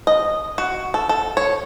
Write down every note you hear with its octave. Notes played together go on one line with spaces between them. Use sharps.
D#5
F#4
A4
A4
C#5